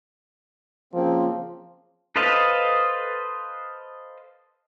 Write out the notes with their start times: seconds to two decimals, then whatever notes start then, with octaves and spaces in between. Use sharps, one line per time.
0.93 C#3 F3 A#3 C4
2.16 A4 B4 C5 D#5 F5